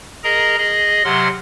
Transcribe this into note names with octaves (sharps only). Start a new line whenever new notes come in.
G#4 A#4 D#5 A#5
G#4 D#5
C3 F#3 F#5 C6 F6